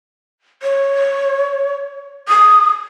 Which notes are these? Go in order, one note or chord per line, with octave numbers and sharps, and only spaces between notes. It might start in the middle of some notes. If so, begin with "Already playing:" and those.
C#5
D#6